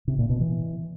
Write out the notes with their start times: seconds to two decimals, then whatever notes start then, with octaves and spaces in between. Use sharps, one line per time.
0.08 C3
0.19 A#2
0.29 B2
0.40 E3